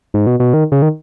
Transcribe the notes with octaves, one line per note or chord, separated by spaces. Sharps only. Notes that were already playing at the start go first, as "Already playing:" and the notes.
G#2
B2
B2
D#3
C#3
D#3